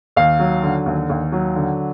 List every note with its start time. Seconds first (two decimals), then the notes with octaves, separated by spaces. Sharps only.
0.16 D#2 F5
0.40 F#3
0.63 D3
0.86 D#2
1.09 D#2
1.32 F#3
1.56 D3